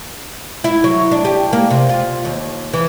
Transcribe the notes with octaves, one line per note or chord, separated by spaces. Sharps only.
E4
F#3
D4
G4
A#3
C3
F4
D#2
E3